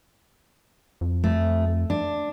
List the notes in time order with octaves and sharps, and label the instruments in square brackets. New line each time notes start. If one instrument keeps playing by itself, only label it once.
[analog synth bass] F2
[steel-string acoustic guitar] A3
D4